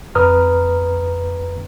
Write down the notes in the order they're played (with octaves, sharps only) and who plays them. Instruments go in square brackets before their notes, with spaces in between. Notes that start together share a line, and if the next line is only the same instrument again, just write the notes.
[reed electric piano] F2 B4 A#5 D#6 F6